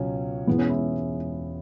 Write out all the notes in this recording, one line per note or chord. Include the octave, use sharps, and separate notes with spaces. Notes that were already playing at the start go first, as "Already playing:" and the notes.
Already playing: C#2 B2 F#3 C#4
E1 E2 E3 G#3 B3
C#4
E4